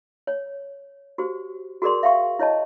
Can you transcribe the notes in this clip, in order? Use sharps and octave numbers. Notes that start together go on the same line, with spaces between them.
C#5
F#4 G4 C5
F#4 G#4 A#4 D5 C6
E5 F5 G5 C#6
E4 C#5 D#5 A5